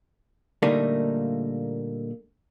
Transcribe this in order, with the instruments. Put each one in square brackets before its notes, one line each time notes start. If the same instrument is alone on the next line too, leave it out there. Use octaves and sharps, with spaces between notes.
[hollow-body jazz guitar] A#2 D3 G3 A3 A#3 D#4